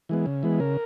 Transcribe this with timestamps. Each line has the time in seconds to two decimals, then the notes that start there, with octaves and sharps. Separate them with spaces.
0.09 E3 G#3 B3
0.26 C#3
0.43 E3 G#3 B3
0.60 C#3 A#4